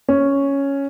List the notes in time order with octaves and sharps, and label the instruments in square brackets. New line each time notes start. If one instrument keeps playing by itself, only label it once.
[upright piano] C#4